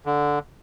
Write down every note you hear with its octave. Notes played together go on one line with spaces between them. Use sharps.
D3